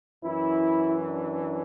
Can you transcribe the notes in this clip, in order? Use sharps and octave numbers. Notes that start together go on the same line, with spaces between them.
F#2 E3 E4
D4